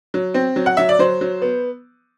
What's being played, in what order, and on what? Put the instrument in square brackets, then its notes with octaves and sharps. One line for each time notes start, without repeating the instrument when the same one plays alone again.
[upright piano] F#3
C4
F#3
F#5
F#3 E5
D5
F#3 C5
F#3
B3